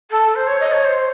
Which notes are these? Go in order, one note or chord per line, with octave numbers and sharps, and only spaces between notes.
A4
C5
C#5
D#5
C#5
C5